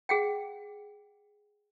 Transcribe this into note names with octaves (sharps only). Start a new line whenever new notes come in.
G#4 F#5 G5